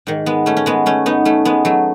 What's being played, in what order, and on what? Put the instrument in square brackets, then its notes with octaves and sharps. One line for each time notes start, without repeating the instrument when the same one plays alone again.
[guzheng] G#2 D#3
G#3 B3
A3 C#4
C#4
G#3 B3
A3 C#4
B3 D#4
A3 C#4
G#3 B3
F#3 A3